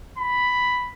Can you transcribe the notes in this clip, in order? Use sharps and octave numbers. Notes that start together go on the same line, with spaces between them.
B5